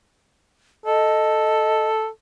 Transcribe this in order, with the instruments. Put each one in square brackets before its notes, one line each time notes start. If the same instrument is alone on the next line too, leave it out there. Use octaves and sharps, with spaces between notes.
[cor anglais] A4 [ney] D#5